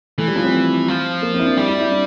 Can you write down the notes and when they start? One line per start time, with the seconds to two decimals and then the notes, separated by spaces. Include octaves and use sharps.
0.18 E3 A3
0.27 G3
0.36 F3
0.44 C4
0.88 F3
1.22 A#3
1.34 C4
1.39 E4
1.45 D4
1.57 G3 E4
1.68 E4
1.80 E4
1.91 D4